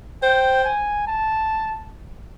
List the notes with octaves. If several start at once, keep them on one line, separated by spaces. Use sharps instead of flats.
C5 G5
G#5
A5